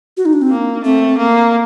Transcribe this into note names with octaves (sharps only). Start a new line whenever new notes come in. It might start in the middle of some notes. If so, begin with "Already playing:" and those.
F#4
D#4
D4
C4
A#3
A3 C4
A#3